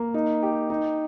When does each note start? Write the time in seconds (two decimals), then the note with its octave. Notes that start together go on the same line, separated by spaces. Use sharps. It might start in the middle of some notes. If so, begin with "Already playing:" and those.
Already playing: A#3
0.14 D#4
0.42 G4
0.70 D#4